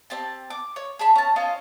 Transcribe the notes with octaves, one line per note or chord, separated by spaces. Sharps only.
C4 G4 A5
D6
C#5
G#4 A5 B5
C#4 A5
C#4 F4 C5 D#5